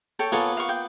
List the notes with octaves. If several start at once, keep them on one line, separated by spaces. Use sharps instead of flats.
A4 C#5 G5
A#3 B3 F4 A4 C#5 G#5
F5 C#6
G5